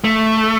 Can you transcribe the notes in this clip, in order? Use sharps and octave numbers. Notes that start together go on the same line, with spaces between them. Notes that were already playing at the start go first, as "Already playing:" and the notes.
A3